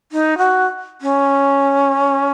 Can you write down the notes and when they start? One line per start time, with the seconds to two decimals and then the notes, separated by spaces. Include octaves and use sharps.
0.12 D#4
0.38 F#4
1.01 C#4